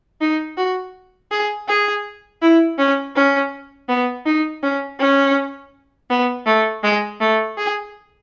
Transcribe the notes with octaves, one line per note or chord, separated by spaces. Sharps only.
D#4
F#4
G#4
G#4
E4
C#4
C#4
B3
D#4
C#4
C#4
B3
A3
G#3
A3
G#4